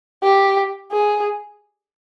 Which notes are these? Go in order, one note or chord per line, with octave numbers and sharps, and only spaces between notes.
G4
G#4